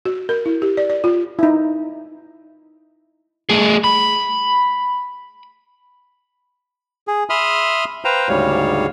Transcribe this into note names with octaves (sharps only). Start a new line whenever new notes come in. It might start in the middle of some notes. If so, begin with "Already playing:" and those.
F#4
A#4
E4
G4
D5
D5
F4
D#4 E4
A3 G#4
B5
G#4
E5 B5 C6 D#6 F6
B4 C5 F5 G5 A#5
D2 G#2 C#3 G3 C#5 F5